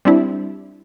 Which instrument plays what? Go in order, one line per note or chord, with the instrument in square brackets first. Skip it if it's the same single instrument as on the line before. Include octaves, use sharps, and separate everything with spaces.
[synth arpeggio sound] G3 C4 D4 E4